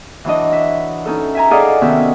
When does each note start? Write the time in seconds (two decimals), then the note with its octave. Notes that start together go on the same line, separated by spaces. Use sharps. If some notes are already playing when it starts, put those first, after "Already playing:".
0.25 E3 F#3 D4 D#5
0.53 E5
1.06 C#4 D#4 A4
1.35 E5 G#5 A#5
1.51 G#4 A4 D5 D#5 F5 F#5
1.82 C3 D#3 B3 C#4 F#4 E5